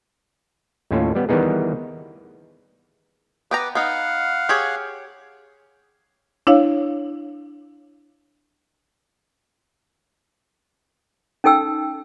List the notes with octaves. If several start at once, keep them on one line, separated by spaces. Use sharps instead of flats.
D#2 A2 C#4 F4 A4
G3 B3 C#4
D#3 E3 G3 B3 D#4 G#4
B3 B4 G5 A#5 D6
B3 D#4 F5 F#5
G4 G#4 C#5
D4 E4 C#5 F5
C#4 D#4 A4 G5 E6